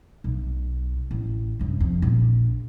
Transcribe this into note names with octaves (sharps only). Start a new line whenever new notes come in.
B1
A1
F#2 C3
F2
A#1